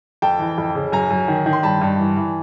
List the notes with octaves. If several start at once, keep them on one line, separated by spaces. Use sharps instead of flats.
F2 G5 A5
E3
F2
C#3
F#2 G#5 A#5
F#2
D#3
D#3
C6
G2 A5 B5
G2
E3
E3